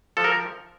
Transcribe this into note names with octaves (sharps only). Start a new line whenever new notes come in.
F3 A4
A#4